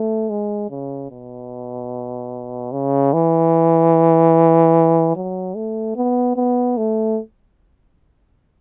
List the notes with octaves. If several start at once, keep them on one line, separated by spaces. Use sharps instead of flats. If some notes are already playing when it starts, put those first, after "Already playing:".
Already playing: A3
G#3
C#3
B2
C#3
E3
F#3
A3
B3
B3
A3